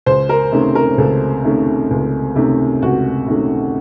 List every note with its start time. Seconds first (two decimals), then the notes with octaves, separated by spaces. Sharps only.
0.06 C#2 C5
0.29 A#4
0.52 C3 D#3 A3 C#4
0.75 A#4
0.98 C#2 A4
1.44 C3 D#3 A3 C#4
1.91 C#2
2.36 C3 D#3 A3 C#4
2.82 C#2 F#4
3.28 C3 D#3 A3 C#4